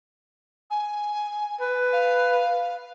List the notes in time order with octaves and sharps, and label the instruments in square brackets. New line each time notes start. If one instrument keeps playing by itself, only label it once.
[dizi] G#5
[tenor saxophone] B4
[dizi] F5